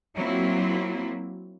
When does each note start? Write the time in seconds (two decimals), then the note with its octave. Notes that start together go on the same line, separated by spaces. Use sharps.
0.15 F#3 A#3 C4 E4 F4